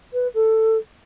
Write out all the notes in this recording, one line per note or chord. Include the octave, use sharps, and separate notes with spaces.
B4
A4